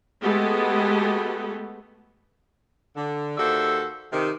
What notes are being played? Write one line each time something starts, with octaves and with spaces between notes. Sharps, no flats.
G#3 A3 B3 F#4 G4 A4
D3
D#2 F#4 A4 C5 D5 E5
C3 D#3